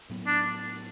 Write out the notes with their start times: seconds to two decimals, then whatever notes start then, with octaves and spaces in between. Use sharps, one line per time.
0.09 A2 F#3 B3
0.27 D4